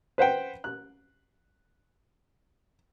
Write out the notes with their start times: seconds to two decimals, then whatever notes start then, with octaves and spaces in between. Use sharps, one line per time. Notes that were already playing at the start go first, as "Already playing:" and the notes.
0.18 B4 C5 F#5 G5
0.64 F#6